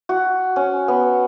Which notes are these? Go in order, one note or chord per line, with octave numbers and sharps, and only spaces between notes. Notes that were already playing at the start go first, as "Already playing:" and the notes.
F#4
C#4
B3